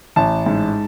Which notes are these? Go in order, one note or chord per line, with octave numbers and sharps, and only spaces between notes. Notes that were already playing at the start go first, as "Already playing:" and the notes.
A1 A5
G#2